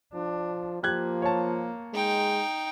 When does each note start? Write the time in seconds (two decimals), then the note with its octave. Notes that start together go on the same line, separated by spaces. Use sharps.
0.14 F3 D4
0.83 F3 A#3 G4 F#6 G#6
1.22 C#5 A5
1.94 G#3 D#4 G5